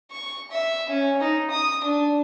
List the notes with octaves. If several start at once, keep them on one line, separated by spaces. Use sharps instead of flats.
C#6
E5
C#4
D#4
D#6
D4